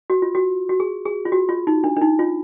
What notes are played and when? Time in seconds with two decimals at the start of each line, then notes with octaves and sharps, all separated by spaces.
0.10 F#4
0.22 F4
0.35 F#4
0.69 F#4
0.80 G#4
1.05 G#4
1.25 F4
1.32 F#4
1.49 F4
1.67 D#4
1.84 D4
1.96 D4
2.01 D#4
2.19 F4